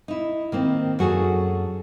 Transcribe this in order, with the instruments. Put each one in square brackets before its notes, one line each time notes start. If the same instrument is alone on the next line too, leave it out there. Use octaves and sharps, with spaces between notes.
[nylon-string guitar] D#4 E4
D#3 A#3 C4
F#2 F#4 G#4 A4